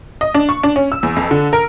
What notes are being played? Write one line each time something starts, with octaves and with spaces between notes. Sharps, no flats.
D#5
D4
C#6
D4
C#4
E6
E2
F2
D3
A#4